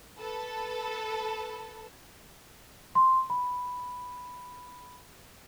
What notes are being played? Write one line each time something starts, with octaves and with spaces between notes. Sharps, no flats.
A4 B4
C6
B5